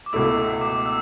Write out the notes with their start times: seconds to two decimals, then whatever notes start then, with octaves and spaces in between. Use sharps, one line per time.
0.06 D6
0.13 C#2 B2 A3 E4 E6
0.61 D6
0.86 E6